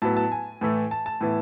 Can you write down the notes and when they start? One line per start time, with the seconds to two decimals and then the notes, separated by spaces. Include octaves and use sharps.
0.02 A2 F#3 B3 A5
0.17 A5
0.32 G#5
0.61 A2 E3 A3
0.91 A5
1.06 A5
1.21 A2 E3 B3